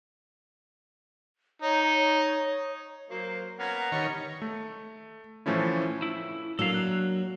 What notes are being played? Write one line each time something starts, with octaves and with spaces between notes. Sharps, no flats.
D#4 C#5
F#3 A#3 F#4 C5
A#3 B3 C#4 F#5 A#5
D#3 G3 B4 C#5
A3
A2 E3 F3 A3 C#4 E4
E4
F#3 A#3 D4 A4 F5
F#6